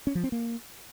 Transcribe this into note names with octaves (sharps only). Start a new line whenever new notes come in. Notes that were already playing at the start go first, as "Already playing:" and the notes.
C#4
F3
C4
A#3